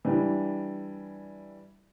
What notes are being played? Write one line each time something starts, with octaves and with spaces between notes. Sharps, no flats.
E3 G3 D4